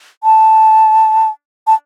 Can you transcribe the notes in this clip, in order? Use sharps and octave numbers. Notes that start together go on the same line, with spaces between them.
A5
A5